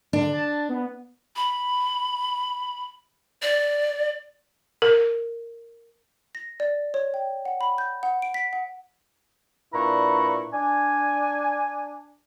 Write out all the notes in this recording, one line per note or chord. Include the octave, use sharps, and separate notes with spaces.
D3 D4
A5
B3
B5
D5
A#4
A#6
D5
C#5
G5
F#5
B5
G6
F#5
D7
B6
F#5
A#2 D4 E4 B4 A#5 C#6
D4 G#5